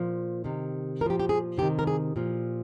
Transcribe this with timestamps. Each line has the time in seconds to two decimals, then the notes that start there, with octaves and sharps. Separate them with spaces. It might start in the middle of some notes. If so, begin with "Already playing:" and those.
Already playing: A#2 F3
0.44 C3 D#3
1.01 A#2 A#4
1.06 F3 G4
1.20 G4
1.29 G#4
1.58 C3 D#3 G4
1.79 A#4
1.87 G#4
2.16 A#2 F3